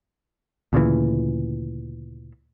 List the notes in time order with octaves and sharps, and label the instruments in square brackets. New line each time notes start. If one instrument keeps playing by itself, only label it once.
[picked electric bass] D2 A#2 C#3 E3